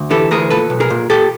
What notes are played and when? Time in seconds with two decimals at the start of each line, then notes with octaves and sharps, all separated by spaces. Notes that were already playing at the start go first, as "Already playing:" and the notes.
Already playing: D2
0.11 E3 G4 A4
0.31 D2 G#4 A#4
0.50 A#2 A4 B4
0.70 B1
0.80 G#4 A#4
0.90 A#2
1.10 A#2 G4 A4